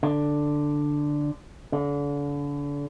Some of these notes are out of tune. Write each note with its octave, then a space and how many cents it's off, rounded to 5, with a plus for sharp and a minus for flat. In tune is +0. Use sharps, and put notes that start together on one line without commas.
D3 +5
D3 -35